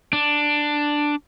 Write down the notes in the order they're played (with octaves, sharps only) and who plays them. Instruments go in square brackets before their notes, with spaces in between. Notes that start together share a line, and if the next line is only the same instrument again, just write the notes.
[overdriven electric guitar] D4